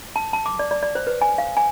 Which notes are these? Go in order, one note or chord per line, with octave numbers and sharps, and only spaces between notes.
A5
A5
D6
D5
D5
D5
C5
B4
G#5
F5
G#5